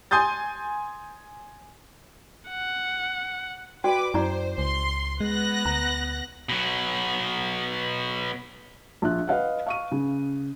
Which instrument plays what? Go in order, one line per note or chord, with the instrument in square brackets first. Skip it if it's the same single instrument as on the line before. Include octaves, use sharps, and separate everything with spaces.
[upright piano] G#5 C6 D#6 G6 A6
[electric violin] F#5
[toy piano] F#4 D5 G5 [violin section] B4 D6
[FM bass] F#2 [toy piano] E4 D5 A#5 [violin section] C5
[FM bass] C#2 [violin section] C6
[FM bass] G#3 [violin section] B3 F#6 A#6
[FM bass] D2 [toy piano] A#5
[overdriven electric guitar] B2 F#3
[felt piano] A#1 F4 F#6
B4 D#5 F5 F#5
F5 C#6 D#7
C#3